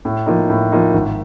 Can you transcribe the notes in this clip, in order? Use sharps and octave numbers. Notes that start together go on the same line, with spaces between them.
A2
F3 A#3 D#4
A2
F3 A#3 D#4
G#1